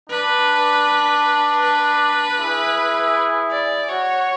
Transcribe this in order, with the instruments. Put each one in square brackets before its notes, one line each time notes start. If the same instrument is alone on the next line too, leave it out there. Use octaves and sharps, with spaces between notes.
[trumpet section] D4 [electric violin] B4
[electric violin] B4
[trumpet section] E4 G#4
[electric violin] D5
[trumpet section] F#4 [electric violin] C#5